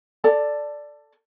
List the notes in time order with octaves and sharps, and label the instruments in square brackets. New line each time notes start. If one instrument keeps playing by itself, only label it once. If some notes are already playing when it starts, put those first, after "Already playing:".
[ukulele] A4 D5 A5